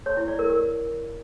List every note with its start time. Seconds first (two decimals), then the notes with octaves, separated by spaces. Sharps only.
0.06 C#5
0.17 E4
0.28 D5
0.39 A#4
0.50 A#4